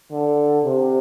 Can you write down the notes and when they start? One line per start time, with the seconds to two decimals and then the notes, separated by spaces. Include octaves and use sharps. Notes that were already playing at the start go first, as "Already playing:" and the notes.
0.11 D3
0.64 C3